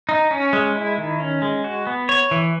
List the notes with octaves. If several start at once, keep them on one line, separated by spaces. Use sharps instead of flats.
D#4
C#4
G#3
E4
D#3
C#4
G#3
F#4
B3
C#5
E3